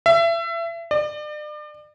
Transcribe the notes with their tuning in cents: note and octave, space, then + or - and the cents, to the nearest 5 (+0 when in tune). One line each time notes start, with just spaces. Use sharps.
E5 +30
D5 +40